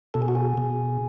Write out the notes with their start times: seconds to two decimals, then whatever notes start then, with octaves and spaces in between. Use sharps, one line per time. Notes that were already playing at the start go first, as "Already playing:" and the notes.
0.14 B2 A4
0.22 G#4
0.28 F#4
0.35 G#4
0.57 B2